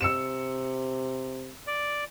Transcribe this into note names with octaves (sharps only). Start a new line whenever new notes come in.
C3 E6 C#7 E7
D5